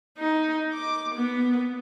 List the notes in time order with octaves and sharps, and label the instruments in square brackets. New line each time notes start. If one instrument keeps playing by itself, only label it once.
[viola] D#4
D6
B3